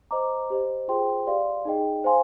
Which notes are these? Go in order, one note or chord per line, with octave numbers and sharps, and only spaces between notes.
C5 D#5 A#5 D6
G4 C5 D#5
F4 G#4 C5 G5 C6
G4 D5 F5 C6
D#4 G#4 D#5 G5
C5 F5 G#5 C6